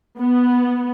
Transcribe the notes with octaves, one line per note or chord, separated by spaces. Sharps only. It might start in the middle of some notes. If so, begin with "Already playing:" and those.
B3